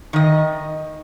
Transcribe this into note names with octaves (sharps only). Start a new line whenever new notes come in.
D#3 D#5